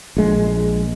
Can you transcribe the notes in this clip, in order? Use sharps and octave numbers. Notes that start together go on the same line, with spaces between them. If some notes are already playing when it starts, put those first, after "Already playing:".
A#1 G#3